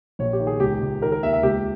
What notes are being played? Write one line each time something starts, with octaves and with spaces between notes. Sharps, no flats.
A#1 C#5
G4
D#3
G#4
C#2 G4
C#2
D#3 A#4
A#4
D#2 E5
E5
C#2 G4